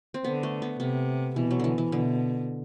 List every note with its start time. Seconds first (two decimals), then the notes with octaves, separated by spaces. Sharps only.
0.14 C4
0.24 D3 B3
0.43 A3
0.62 B3
0.80 C3 B3
1.36 B2 E3
1.51 F#3
1.59 D3 E3
1.78 E3
1.92 B2 D3